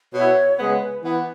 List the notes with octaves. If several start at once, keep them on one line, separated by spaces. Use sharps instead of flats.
B2 B3 E4 C#5
C#3 G#3 B3 G#4 B4
E3 B3 B4